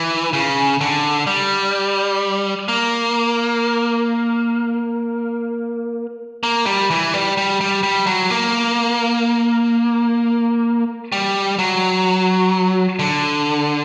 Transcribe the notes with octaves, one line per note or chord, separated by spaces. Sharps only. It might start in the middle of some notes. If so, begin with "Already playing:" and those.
Already playing: E3
C#3
D3
G3
A#3
A#3
G3
E3
G3
G3
G3
G3
F#3
A#3
G3
F#3
D3